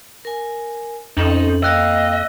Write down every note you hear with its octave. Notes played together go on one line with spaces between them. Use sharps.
A#4 G#5
F2 C4 C#4 D#4 A4 F#7
A#3 D#5 F5 G5 E6 F#6 A#6